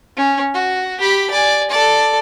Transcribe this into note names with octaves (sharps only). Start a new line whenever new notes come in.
C#4
F#4
G4 B5
D5 G#5
A4 D5